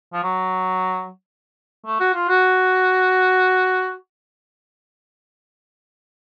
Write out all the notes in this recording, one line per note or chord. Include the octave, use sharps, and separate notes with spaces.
F3
F#3
A3
F#4
F4
F#4